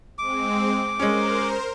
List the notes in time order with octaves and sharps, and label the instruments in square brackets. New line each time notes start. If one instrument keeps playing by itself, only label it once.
[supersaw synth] G#3 C4 [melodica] D6
[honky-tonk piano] G#3 C#4 [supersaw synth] A#4 C5